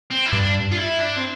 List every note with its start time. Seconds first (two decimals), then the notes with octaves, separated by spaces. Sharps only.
0.11 C4
0.26 E4
0.33 G2 D4
0.72 F4
0.78 E4
1.00 D4
1.18 C4